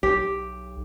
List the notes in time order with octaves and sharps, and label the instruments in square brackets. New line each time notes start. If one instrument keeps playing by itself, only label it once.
[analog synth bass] B1 [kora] G4